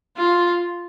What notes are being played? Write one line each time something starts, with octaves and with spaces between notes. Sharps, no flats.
F4